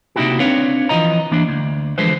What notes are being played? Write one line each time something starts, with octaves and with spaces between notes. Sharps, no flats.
C3 A#3 D#4 E4 F#4 G4
C4 D4 B4 C#5 F5
E3 F3 D#5 A#5
E3 A#3 D4
D2
D3 E3 F3 G#3 B4 C5